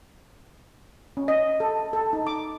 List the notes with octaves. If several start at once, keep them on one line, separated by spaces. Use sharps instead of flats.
C#4
D#5
A4
A4
D#4
D6